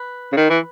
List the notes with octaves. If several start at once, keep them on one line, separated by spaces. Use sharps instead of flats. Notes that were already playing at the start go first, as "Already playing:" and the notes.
Already playing: B4
C#3
D#3
E3